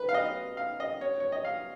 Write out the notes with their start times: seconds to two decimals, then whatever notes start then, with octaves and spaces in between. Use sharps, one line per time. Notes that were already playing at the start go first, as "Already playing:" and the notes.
Already playing: B4
0.09 F5
0.14 D#5
0.57 F5
0.80 D#5
1.01 C#5
1.20 C#5
1.32 D#5
1.45 F5